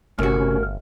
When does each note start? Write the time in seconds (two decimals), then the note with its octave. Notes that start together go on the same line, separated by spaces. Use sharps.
0.19 G1 A2 C3 C#4 F#4 A#4